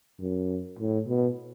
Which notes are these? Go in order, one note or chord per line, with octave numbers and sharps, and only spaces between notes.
F#2
A2
B2